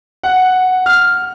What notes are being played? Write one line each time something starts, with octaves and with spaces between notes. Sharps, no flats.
F#5
F6